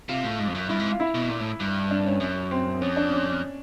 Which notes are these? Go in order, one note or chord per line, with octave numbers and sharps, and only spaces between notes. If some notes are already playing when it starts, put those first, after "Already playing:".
C3 F4
A2
G#2
F2
F#2
G2 E4
G#2
F4
E4
B2
A#2
A2
G2
D4
C#4
F#2
C4
F2 C#4
D4
C#4